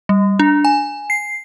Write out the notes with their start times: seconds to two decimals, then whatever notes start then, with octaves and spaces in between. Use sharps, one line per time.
0.09 G3
0.39 D4
0.65 G#5
1.10 C7